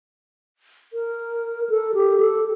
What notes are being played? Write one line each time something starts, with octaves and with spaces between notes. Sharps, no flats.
A#4
A4
G4
A4